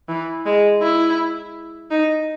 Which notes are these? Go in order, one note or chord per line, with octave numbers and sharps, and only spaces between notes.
E3
G#3
E4
D#4